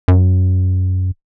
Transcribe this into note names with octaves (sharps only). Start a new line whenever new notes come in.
F#2